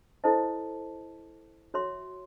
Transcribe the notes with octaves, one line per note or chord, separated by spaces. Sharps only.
E4 A4 C5 D#5 A5
F#4 C#5 E5 C6